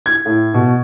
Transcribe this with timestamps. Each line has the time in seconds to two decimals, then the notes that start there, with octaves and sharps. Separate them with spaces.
0.06 G#6
0.26 A2
0.54 B2